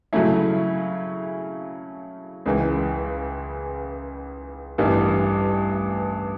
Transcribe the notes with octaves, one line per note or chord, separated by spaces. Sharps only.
C#3 F#3 A3 C#4 E4
C#2 C#3 E3
A1 G2 E3 G3